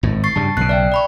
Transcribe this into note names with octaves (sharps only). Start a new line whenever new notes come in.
G#1 A2
C#6 A6 C7
G2 C#3 G3 A5
B1 C#3 F#6 C7
D5 E5 G5
D5 B5 C#6